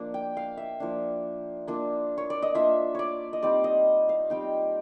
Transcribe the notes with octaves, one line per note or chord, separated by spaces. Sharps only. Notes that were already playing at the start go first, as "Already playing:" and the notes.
Already playing: F3 A#3 D4
G5
F5
E5
F3 A#3 D4
A#3 D4 F4
C#5
D5
D#5
A#3 D4 F4 E5
C#5 D5
D#5
G3 C4 D#4 D5
D#5
F5
G3 C4 D#4 G5